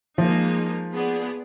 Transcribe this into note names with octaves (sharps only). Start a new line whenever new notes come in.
F3 G#3 A#3 D#4
B3 G#4 D5